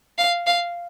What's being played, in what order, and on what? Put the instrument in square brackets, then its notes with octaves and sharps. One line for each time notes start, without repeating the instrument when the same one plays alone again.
[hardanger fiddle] F5
F5